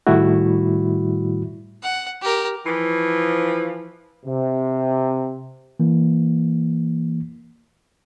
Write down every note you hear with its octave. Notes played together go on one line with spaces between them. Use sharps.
A2 D#3 G3 A3 E4 F#4
F#5
G4 A#4
E3 F3
C3
E3 A#3